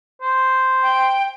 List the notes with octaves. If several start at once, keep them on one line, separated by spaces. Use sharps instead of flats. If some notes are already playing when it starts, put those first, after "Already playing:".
C5
G5